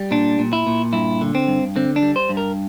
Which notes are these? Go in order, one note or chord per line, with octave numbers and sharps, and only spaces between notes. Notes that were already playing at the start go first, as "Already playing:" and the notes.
Already playing: G3
A#2 D4
A#2
E4
A#2
G2 E4
D3
C4
G2
D3 C4
D4
G3
C5
G2
A#4